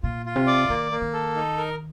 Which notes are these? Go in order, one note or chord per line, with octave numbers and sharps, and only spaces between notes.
A#2 F4
F4
C3
D5
D#3 A#3
A#3
D#3
A4
D#4
A#4